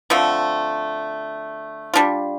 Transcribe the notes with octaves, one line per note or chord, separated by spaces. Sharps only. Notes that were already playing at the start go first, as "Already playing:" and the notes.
D3 F3 A3 C4
G3 D4 F4